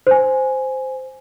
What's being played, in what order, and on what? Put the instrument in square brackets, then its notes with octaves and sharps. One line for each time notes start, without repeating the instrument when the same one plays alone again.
[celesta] C5 G#5